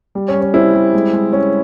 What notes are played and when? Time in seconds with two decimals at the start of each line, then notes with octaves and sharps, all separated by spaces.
0.15 G3
0.28 C#4
0.34 G3
0.41 C#4
0.54 G3 C4 E4
0.74 G3
0.93 G#3
1.13 G#3
1.33 G#3 C#4